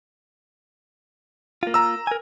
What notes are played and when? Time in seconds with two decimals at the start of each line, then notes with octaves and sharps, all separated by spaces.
1.63 A#3 F4
1.74 A#5 E6
2.07 A#4 G#5